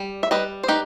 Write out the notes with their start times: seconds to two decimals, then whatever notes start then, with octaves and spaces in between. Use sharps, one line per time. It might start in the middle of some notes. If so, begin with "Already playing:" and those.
Already playing: G3
0.23 E5
0.31 G3 B4 D#5
0.63 C5
0.68 D#4 G4 B4